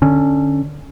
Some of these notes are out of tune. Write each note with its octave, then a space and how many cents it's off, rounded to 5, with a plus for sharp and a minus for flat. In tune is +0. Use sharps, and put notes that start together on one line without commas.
D3 +15 C#4 +0